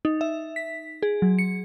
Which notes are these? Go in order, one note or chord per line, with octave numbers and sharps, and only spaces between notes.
D#4
E5
B6
G#4
F#3
C#7